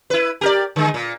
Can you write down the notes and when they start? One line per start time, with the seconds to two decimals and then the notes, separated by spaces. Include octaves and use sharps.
0.10 E4 B4
0.41 G4 A#4 D5
0.76 D3 G#3
0.94 A#2